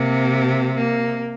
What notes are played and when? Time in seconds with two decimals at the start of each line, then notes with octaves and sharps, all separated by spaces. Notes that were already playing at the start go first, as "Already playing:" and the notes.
Already playing: C3 A#3
0.75 A#3